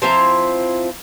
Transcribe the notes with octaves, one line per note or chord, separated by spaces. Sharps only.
F3 C4 E4 A#5